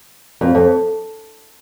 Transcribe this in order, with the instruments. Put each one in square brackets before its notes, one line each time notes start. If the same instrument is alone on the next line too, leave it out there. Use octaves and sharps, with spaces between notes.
[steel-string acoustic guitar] F2
F2